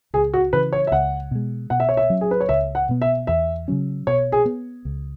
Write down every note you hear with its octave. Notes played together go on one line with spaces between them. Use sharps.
C#2 G#4
F#4
C#3 E3 B4
C#5
E5
C#2 F#5
B2 G#3
B2 F#5
E5
C#5
E5
F#3 C#4
G#4
B4
C#5
C#2 E5
F#5
B2 B3
E5
E2 E5
C#3 F#3 C#4
B2 C#5
G#4
B3
C#2